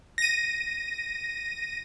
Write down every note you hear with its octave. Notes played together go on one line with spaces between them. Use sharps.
A#6 D#7